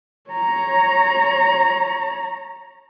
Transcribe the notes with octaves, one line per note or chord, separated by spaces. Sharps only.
C#5 A#5